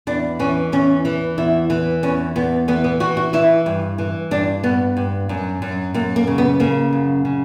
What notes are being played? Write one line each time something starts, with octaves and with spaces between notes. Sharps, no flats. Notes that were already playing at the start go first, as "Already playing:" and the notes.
E2 D4
E3 C#4
E2 C#4
E3
E2 E4
E3
E2 C#4
E2 B3
E3 B3
B3
E3 F#4
F#4
E3 E4
G2
E3
G2 D4
G2 B3
G2
F#2
F#2
F#2 A#3
A#3
C#3
B3
C#3 A#3
F#2
C#3